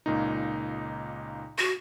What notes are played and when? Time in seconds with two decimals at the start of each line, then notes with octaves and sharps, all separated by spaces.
0.06 C#2 A#2 D#4
1.58 F#4